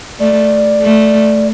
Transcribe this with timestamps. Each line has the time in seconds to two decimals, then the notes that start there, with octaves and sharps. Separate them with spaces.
0.20 A3 D5
0.82 A3